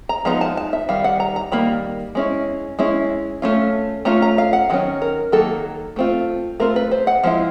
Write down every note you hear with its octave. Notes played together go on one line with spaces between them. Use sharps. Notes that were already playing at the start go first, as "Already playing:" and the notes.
A#5
F3 G#3 B3 D#4 A#5
A5
A5
E5
D#3 G3 F5
F#5
A#5
A#5
D#3 G3 A#3 B5
G#3 C#4 E4
G#3 C#4 E4
A3 C#4 F4
A3 C#4 F4 A#5
A#5
F5
F#5
D#3 F#3 C#4
A#4
D#3 F#3 A#3 A4
A3 C4 F4
A3 C4 F4 A#4
B4
C5
F#5
F3 G#3 C4 E4